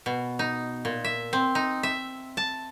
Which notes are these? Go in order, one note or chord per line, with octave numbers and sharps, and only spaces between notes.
B2
D#4
A#2
E5
C4
D#4
E5
A5